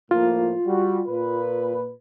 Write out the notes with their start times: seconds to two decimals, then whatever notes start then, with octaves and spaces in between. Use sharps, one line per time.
0.11 A2 F3 A#3 F4
0.66 G3 F#4
1.08 A#2 B4